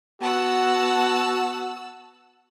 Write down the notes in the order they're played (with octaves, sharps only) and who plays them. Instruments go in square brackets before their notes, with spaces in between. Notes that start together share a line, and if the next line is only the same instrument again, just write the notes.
[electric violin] B3 F#5 [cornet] F#4 [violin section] A5 E6 F#6